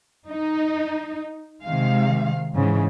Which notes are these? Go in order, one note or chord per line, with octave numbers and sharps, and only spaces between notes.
D#4
C3 D#3 G#3 F5
G#2 C#3 E3